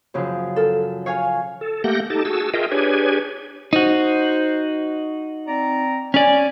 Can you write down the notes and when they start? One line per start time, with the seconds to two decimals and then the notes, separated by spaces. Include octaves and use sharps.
0.14 F#2 C#3 F3
0.56 A4 A#4
1.06 C#5 F5 G#5
1.61 A4
1.84 A3 A#3 G4 F#5 G6 A#6
2.10 D#4 G4 A4 A5
2.25 F#4 G#4 A5 E6
2.54 F4 G#4 A#4 D#5 E5 G5
2.72 D4 G4 G#4 B4 C#5 G#5
3.73 D#4 F#4 C5
5.47 C4 D5 A#5
6.14 C#4 D5 G#5